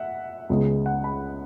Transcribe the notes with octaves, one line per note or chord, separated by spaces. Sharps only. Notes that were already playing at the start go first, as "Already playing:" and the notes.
Already playing: E5 F#5
C#2 C#3 G#3 B3
F#5
B5